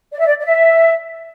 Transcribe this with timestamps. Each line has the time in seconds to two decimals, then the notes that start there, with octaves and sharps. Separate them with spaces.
0.12 D5
0.19 E5
0.26 D5
0.40 D5
0.44 E5